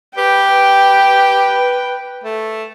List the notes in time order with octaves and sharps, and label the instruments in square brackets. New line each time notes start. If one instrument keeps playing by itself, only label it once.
[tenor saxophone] G4 [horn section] B4 [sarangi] G5
[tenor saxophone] A3